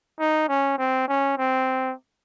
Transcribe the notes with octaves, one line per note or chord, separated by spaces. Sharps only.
D#4
C#4
C4
C#4
C4